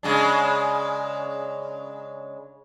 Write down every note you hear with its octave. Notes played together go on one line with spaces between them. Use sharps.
C#3 G#3 D4